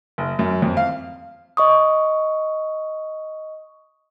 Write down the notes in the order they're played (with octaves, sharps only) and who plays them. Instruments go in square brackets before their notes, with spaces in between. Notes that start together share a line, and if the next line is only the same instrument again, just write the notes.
[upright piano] F#1
F#2
F2
F5
[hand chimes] D#5 C#6 D#6